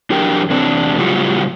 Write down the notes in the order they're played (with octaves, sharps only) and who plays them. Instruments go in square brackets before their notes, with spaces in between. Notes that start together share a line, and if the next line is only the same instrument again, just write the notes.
[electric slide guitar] E2 F#3 D4 G4 A#4 G5
E2 C3 D4
A2 C#3 F#3 G3 F4 F#4